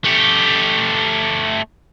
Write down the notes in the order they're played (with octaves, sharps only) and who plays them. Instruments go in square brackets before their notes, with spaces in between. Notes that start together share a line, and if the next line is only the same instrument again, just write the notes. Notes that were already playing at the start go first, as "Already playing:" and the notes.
[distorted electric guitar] A3 G4